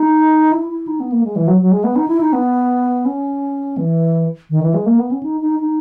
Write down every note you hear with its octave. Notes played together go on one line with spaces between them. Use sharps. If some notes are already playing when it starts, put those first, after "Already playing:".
Already playing: D#4
E4
E4
D#4
B3
A#3
G#3
E3
F#3
F#3
G#3
B3
D#4
E4
D#4
B3
C#4
E3
D#3
E3
G#3
A#3
B3
C#4
D#4
D#4
D#4